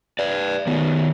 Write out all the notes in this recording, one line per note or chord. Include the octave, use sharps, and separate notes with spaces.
B4 D5
D#3 B3